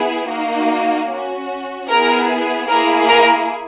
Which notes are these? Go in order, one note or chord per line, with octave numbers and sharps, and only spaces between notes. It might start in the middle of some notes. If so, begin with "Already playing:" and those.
Already playing: B3 E4 G#4
A#3 D#4 F#4
C#4 F#4
B3 E4 G#4 A#4
A#3 E4 G#4 A#4
A#4